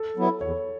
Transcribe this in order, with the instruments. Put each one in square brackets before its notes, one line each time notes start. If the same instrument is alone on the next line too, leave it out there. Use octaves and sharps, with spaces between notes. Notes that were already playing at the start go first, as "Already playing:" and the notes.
Already playing: [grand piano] A4
[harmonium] F#3 B3 E4
[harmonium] E2 [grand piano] C#5